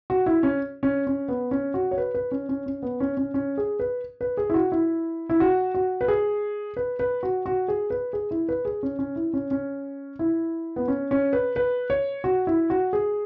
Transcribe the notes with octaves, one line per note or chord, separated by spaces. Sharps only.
F#4
E4
C#4
C#4
C#4
B3
C#4
F#4
C#5
B4
B4
C#4
C#4
C#4
B3
C#4
C#4
C#4
G#4
B4
B4
G#4
E4
F#4
E4
E4
F#4
F#4
B4
G#4
B4
B4
F#4
F#4
G#4
B4
G#4
E4
B4
G#4
C#4
C#4
E4
C#4
C#4
E4
B3
C#4
C#4
B4
B4
C#5
F#4
E4
F#4
G#4